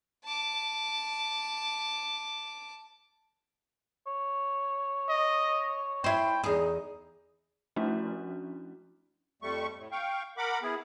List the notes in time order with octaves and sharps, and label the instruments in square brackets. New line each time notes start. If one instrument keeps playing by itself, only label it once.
[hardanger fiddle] A5 D6
[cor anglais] C#5
[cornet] D#5
[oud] E4 C5 [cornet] G5
[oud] E2 G#4 [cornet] D#4
[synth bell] F3 A3 C#4 D4 E4 F#4
[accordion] F2 G3 A3 C#6
A2
F5 G5 C#6
A#4 F#5 B5 D6
B3 E4 G#4